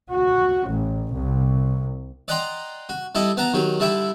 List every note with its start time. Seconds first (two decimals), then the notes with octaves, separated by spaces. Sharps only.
0.11 F#4
0.67 A1
1.14 C2
2.28 D5 D#5 F#5 G5 A#5 C6
2.89 F#4
3.15 G3 E4 A4 D#5
3.37 B3 F#5 A5 A#5
3.53 D#3 F#3 G4
3.80 D3 G3 E4 E5 G5 D6